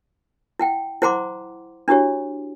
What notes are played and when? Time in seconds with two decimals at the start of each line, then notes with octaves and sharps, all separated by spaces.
0.59 E4 F#5 G5
1.02 E4 C5 F#5 A#5 C6 D6
1.88 D4 E4 F#4 G4 C#5